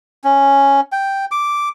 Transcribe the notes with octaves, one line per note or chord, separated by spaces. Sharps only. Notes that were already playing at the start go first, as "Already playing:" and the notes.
C#4
G5
D6